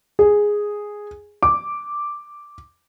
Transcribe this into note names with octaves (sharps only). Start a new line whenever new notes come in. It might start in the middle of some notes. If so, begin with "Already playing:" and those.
G#4
D6